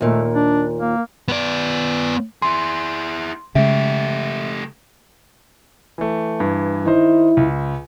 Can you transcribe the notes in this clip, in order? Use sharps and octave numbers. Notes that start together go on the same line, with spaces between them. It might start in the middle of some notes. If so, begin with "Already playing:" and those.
D#2 A#2 A3
D4
A#3
B3 D5
E4 G#4 C6
C#3 G#3 A3 G4 E5
E3 A3
G2 E3
D#3 D#4 E4 C5
C#2